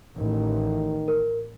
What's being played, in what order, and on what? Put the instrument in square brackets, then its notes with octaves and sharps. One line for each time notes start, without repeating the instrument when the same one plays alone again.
[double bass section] A1 [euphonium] D#3
[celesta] A#4